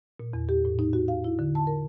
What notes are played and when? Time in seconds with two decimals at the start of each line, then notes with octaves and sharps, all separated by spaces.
0.20 A#2
0.33 E2
0.49 G4
0.65 A2
0.79 D#4
0.93 F#4
1.08 F5
1.24 E4
1.39 D3
1.55 A5
1.67 A#4